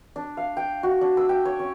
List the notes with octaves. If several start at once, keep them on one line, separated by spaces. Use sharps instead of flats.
D4
F5
G5
F#4
D4
E6
G5
C#5
C#4